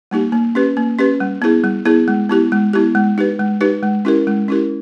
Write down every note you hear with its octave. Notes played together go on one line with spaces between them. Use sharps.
G3 A#3 D#4 G4
A#3
C#4 G4 B4
A#3
C#4 G4 B4
G3
B3 E4 G#4
G3
B3 E4 G#4
G#3
B3 E4 G4
G#3
B3 E4 G4
G#3
D#4 G4 B4
G#3
D#4 G4 B4
G#3
C#4 E4 G4 A#4
G#3
C#4 E4 G4 A#4